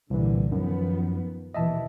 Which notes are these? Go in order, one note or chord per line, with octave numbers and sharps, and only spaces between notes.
C2 A#2 D3 E3
F#2 D#3 F3 B3
D#2 B2 E3 D#5 E5 A5